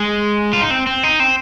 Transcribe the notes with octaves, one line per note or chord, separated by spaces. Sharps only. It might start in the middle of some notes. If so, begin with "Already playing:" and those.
Already playing: G#3
F4
D#4
C4
C4
D#4
C4